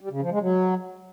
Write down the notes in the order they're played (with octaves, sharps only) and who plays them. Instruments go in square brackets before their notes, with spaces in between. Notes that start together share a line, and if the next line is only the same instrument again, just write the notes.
[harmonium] G3
C#3
F3
G#3
F#3